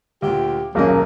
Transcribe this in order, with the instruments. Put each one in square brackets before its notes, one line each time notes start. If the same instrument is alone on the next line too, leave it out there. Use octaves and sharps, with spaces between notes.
[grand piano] D2 A#2 [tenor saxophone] G4
[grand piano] D#1 B1 D#5 [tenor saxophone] F#3 [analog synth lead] A#3 [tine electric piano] C#4 G#4